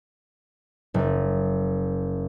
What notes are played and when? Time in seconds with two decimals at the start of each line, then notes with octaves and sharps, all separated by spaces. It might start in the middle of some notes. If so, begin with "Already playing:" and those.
0.94 F#1